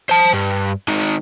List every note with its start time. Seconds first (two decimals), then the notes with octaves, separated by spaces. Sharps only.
0.09 C5 A5
0.33 G2
0.88 D#3 G#3